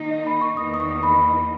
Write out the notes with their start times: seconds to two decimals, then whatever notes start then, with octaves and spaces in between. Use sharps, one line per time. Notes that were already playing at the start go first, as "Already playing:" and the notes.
Already playing: D#3 A#3 D#4
0.11 D#5
0.27 B5
0.41 C#6
0.57 E2 D#3 A#3 D#4 D#6
0.74 D#6
0.80 C#6
1.03 B5